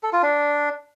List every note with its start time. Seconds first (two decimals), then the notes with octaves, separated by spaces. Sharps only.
0.03 A4
0.13 F4
0.23 D4